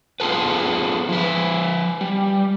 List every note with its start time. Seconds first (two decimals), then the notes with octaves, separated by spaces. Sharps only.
0.20 B3 F4 G#4 A4 B4
1.09 F3 B4
2.01 G3